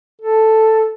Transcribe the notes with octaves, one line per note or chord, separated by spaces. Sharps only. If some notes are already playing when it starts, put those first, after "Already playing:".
A4